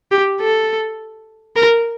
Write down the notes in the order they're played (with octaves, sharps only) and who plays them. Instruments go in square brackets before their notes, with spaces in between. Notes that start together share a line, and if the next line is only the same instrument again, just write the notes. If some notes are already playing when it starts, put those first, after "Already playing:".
[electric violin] G4
A4
A#4